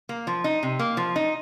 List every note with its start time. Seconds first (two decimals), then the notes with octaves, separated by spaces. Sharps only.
0.09 A#3
0.27 F3
0.44 D#4
0.63 C3
0.79 A#3
0.97 F3
1.16 D#4